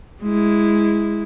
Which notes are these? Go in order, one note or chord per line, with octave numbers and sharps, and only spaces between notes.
G#3 E4